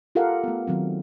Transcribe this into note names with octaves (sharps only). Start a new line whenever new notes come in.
F4 G4 A4 A#4 F5 F#5
A3 B3
D#3 F#3 C4